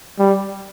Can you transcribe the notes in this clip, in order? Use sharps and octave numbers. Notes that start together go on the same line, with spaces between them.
G3